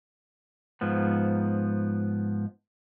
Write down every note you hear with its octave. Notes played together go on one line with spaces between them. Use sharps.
G#2 F3 B3